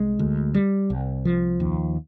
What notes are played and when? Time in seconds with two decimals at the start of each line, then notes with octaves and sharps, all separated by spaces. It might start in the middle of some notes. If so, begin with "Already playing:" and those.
Already playing: C2 G#3
0.19 D2
0.54 G3
0.90 C2
1.25 F3
1.60 D#2